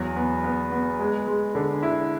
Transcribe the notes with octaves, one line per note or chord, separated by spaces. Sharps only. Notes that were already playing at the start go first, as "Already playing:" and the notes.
Already playing: E2 F#3
B3
B3
B3
G#3
G#3
D3
E4